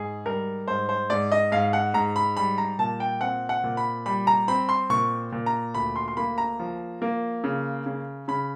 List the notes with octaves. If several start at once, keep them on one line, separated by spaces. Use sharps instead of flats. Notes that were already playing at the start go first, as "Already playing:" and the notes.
Already playing: G#2 G#4
G3 A#4
G#2 C5
C5
G#2 D5
D#5
G#2 F5
F#5
G#2 A#5
B5
G3 B5
A#5
A#2 A5
G5
C4 F#5
F#5
A#2
B5
G3 B5
A#5
C4 B5
C6
A#2 C#6
A#2
A#5
D2 B5
C6
C6
A#3 B5
A#5
F3
A#3
C#3
C#3
C#3 B5